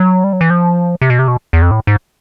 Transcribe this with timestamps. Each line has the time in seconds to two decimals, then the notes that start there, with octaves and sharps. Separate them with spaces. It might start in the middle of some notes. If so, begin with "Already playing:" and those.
Already playing: F#3
0.24 G3
0.33 F#3
0.41 E3
0.50 F3
1.01 C3
1.10 B2
1.19 C3
1.28 B2
1.53 E2
1.62 F2
1.71 A2
1.87 G#2